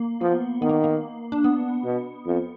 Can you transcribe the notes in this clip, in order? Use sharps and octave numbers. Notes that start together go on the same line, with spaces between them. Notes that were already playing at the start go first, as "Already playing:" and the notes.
Already playing: A#3
F3 B3
D#3 B3
A#3
A#3
D4
B3
B2
F2